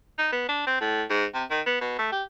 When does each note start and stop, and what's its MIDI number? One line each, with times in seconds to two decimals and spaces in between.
0.18 0.30 63
0.32 0.47 59
0.49 0.63 62
0.67 0.80 60
0.81 1.03 45
1.10 1.26 44
1.34 1.44 48
1.50 1.61 51
1.66 1.78 59
1.81 1.97 47
1.99 2.07 57
2.12 2.23 67